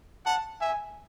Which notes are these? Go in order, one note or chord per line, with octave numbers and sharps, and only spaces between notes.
F#5 A5
E5 G#5